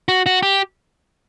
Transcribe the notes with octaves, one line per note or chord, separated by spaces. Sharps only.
F#4
F#4
G4